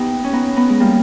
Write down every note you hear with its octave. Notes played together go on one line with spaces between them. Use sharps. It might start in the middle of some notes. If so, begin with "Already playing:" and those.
Already playing: B3 D#4 G4
C#4
B3 D#4
B3 D#4
G#3
G3 A#3